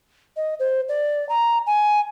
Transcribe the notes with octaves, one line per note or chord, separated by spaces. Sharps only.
D#5
C5
D5
A#5
G#5